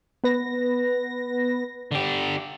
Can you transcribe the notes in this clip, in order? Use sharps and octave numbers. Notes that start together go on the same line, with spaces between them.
B3 B4 A#6
D3 G4